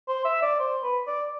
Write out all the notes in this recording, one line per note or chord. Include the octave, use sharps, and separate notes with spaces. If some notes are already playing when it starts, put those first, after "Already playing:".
C5
E5
D5
C5
B4
D5